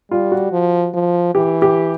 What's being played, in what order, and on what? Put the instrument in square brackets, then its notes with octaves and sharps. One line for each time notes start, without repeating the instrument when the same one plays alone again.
[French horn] G3 [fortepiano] F4
[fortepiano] F#4
[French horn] F3
F3
[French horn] E3 [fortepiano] G4
[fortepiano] G4